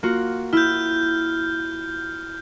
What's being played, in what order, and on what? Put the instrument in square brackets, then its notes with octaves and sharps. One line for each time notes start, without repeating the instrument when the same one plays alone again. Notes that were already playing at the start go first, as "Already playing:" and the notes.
[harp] A#3 F4 F#4
[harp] E4 [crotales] F6 G6